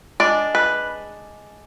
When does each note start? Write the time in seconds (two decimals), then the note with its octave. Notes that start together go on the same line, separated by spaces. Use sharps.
0.20 G#3 D4 D5
0.55 B4